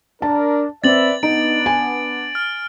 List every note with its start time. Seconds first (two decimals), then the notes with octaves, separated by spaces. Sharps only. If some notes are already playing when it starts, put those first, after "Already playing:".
0.22 D4 A#4 A5
0.84 C4 B4 D5 E5 A6 F#7
1.23 B3 D4 D#4 D7
1.66 G#5
2.35 F6